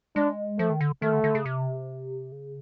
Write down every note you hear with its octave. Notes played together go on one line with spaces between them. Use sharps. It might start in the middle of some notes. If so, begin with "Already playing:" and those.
G#3 D4
F3 A3
D#3
D3
D#3 A3
D3
D3
C#3
C3
C#3